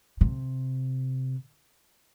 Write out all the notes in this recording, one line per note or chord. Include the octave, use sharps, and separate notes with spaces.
C3